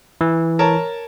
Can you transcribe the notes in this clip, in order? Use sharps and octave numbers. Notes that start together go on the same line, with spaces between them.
E3
A#4 C#5 A5